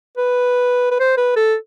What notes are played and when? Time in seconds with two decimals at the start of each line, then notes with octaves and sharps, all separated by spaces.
0.17 B4
0.91 B4
1.00 C5
1.17 B4
1.36 A4